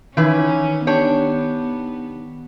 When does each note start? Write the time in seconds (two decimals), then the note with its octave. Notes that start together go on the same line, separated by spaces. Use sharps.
0.17 D#3 E3 C#4 E4 B4
0.87 B3 D4 G4 C#5